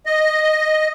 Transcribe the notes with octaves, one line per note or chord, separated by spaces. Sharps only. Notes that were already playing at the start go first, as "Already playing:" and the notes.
D#5